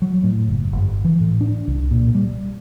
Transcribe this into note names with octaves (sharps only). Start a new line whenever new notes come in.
F#3
A2
F#1
G1
E3
A2
D4
C2
A#2
G3